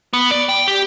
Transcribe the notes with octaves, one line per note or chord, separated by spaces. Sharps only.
B3
D5
G5
G4